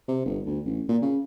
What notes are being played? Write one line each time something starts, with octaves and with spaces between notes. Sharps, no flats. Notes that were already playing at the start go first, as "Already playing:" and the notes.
C3
G1
D2
A1
A#2
C#3